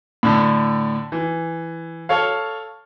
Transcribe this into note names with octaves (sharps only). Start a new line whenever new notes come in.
A2 D3
E3
A4 C#5 F5